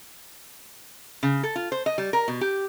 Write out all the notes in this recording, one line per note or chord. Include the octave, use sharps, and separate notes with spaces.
C#3
A4
F4
C5
D#5
G3
A#4
B2
G4